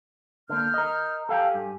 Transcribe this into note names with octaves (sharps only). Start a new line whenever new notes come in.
D3 A#3 F6 G6
A#4 D#5
G4 A4 F5 G5 G#5
G2